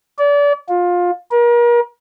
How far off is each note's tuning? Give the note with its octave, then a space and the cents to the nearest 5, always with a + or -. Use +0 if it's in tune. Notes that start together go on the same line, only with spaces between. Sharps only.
D5 -35
F4 +20
A#4 +35